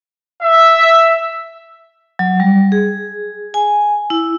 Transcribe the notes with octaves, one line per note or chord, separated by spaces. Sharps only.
E5
F#3
G3
G#4
G#5
E4